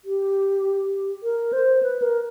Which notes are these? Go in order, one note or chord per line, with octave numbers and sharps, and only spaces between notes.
G4
A#4
C5
B4
A#4